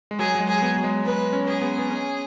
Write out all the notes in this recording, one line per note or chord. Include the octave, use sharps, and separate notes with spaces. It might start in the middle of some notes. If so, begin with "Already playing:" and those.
G#3
F#3 G#4
F#3
G#3
G#4
B3
F#3
G#3
B3 B4
C#4
G#4
B3
B3
C#4